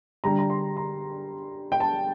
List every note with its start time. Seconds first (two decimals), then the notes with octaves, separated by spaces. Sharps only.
0.24 D3 G3 D4 A#5
0.38 A#5
0.50 C6
0.77 A#5
1.72 G5
1.80 A5